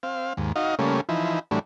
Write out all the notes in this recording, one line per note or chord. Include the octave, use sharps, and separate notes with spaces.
C4 F5
D#2 G#2
D#4 F#4 D#5 F5
C#3 G3 A3 A#3 C#4
E3 F3 D#4 E4
A2 E3 F#3 G3 A3 D4